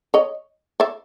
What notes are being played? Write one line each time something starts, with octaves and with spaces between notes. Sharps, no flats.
C#5 D#5
D5 E5